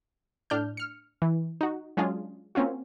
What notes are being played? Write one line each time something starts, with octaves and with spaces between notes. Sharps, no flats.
A2 D4 F6 G6
F6 C#7
E3
D#4 F#4
F#3 G#3 C#4 D4 F4 G#4
A#3 C4 C#4 F4 F#4